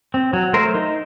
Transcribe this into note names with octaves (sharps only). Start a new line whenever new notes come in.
C4
F#3
A3 A#4 C5
D#4